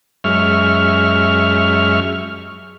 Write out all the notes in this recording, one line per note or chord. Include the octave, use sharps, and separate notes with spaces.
F#2 G#3 E5 C#6 F6